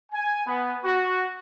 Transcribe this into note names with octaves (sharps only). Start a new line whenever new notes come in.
G#5
B3
F#4